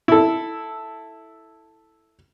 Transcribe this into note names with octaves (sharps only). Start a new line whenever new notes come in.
E4 A4